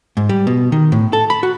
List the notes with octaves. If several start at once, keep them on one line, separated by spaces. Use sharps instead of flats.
G#2
G3
B2
D#3
A2
A4
B5
F#4